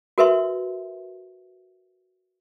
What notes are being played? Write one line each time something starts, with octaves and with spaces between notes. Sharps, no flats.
F#4 A#4 B4 E5 C6